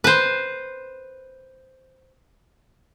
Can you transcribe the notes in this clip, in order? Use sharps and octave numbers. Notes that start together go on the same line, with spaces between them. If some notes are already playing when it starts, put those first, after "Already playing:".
B4 C5